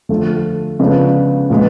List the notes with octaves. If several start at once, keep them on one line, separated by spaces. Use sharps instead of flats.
D3 F3 A3
C#3 F3 G#3 B3 D4
A#2 F3 G#3 B3